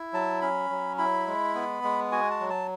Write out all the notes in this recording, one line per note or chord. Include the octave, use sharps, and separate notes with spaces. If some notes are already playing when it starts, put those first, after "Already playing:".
Already playing: E4
F#3 A5
C#4 B5
F#3
E4 B5
G#3
B3
G#3
F#4 G#5
A5
F#3
A5